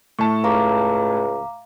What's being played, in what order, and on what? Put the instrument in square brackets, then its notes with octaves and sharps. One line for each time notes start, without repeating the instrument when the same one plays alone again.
[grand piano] A2 A5 [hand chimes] C#6
[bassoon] C#2 [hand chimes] F5 A#5 D6